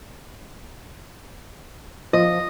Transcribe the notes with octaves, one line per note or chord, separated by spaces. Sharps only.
F3 D#5